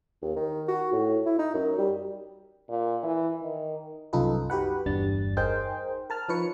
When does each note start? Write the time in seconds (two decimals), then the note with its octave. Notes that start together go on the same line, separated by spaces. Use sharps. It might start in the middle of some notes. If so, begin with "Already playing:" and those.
0.22 D#2
0.36 D#3
0.68 F#4
0.92 A2
1.26 E4
1.38 D#4
1.54 F#2
1.78 G3
2.70 A#2
3.03 E3
3.43 D#3
4.13 C2 F#2 D#4 F4 A4 B4
4.50 F#4 G4 B4 F#5
4.86 G1 E2 G3 D4 A6
5.37 D#4 G#4 A#4 C5 G5
6.10 A#4 A5 F6
6.29 F3 D#4 B4 C#5 C#7